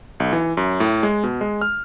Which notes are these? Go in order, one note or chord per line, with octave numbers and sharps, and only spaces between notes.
B1
E3
F#2
A2
G#3
B2
G#3
F6